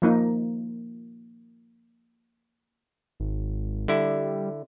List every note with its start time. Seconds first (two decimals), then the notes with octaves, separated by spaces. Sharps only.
0.02 F3 A#3 D#4
3.20 G#1
3.88 D3 G3 E4